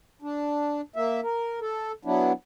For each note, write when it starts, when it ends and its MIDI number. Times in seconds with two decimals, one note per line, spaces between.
0.22 0.81 62
0.96 1.20 58
0.96 1.20 76
1.23 1.60 70
1.61 1.92 69
2.05 2.32 54
2.05 2.32 59
2.05 2.32 62
2.05 2.32 64